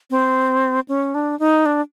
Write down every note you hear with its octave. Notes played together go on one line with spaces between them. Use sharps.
C4
C#4
D4
D#4
D4